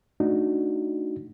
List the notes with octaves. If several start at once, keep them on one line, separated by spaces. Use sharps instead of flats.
A3 D4 D#4 F#4